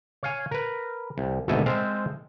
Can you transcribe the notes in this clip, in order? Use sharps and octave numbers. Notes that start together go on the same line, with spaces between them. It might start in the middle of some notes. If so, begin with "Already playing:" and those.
C#5 F5 G#5
A#4 B4
C2
G#1 D2 B2 A4 E5 G#5
G#3 C4 C5 E5 F5 A5